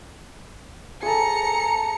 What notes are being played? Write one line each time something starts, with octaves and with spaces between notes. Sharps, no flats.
G#4 A4 A#5 C#7